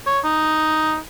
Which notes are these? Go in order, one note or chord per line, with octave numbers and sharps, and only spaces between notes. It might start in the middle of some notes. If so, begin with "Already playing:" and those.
C#5
D#4